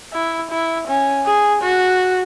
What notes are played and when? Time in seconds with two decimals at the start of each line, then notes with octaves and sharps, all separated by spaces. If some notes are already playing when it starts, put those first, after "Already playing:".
0.14 E4
0.51 E4
0.88 C#4
1.26 G#4
1.62 F#4